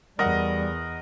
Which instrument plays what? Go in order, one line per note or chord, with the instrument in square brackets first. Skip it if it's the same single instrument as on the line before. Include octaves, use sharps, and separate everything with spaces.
[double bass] E2 [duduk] G3 [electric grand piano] A#4 F#5 [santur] D#5